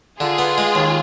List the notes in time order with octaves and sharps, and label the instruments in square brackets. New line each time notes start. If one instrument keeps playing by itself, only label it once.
[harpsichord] D3 [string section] F4 G#4
[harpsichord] B3
G#3
D#2